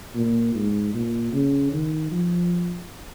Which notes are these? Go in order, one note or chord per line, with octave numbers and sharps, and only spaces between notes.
A#2
G#2
A#2
C#3
D#3
F3